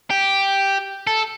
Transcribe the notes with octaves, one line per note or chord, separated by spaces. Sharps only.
G4
A4